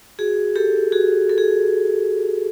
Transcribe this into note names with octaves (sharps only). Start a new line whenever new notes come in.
F#4 G#4
G4 A4
F#4 G#4
A4
G#4